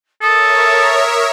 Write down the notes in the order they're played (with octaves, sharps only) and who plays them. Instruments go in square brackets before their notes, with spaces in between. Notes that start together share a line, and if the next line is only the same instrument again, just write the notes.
[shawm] A4 [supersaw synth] A#4 C#5 E5 [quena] D#6